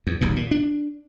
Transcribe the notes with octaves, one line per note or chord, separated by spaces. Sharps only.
E2
D#1 B1 E2 A#2
A#2
D4